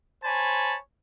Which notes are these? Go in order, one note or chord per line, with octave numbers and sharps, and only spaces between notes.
C5 C#5 G#5 A5 B5